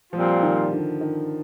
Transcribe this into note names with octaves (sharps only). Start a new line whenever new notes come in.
A#2 F3 G3 C4 F4
D#3
D3
D#3